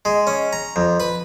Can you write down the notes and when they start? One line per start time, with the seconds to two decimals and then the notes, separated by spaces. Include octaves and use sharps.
0.05 G#3
0.27 C#4
0.53 A#5
0.76 F2
1.00 B4